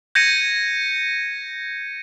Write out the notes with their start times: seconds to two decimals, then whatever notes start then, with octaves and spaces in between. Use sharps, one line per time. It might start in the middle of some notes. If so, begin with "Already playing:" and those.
0.15 G6 G#6 A#6 C#7 D#7